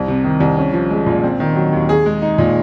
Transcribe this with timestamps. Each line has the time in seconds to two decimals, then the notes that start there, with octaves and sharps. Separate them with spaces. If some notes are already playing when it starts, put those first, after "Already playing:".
Already playing: C2
0.08 C3
0.24 D#3
0.40 C2
0.57 C#4
0.73 F3
0.90 G#3
1.06 A#2
1.24 C4
1.40 D#3
1.56 F#3
1.73 D#2
1.89 G#4
2.06 G#3
2.22 D#4
2.38 A#2